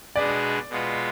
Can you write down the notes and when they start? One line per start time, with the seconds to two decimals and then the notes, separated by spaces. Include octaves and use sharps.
0.16 B2 G#3 D4 G#4 B4 D5
0.70 B2 G#3 B3 F4 B4